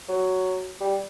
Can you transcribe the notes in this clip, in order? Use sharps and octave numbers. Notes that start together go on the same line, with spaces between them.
F#3
G3